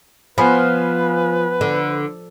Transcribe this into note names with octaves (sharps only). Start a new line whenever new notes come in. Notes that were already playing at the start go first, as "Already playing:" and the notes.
F3 B3 B4 G#5 B5
D3